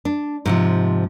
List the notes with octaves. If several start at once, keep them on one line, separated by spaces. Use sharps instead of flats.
D4
G#2 C3 F3